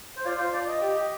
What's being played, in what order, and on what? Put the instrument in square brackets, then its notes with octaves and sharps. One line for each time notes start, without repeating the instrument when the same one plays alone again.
[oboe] C5
[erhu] F4 [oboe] D5
[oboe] C5
D5
D#5
[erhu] G4